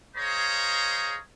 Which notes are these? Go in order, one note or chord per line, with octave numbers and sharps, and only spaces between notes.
G#4 C5 C#5 D#5 F5 A#5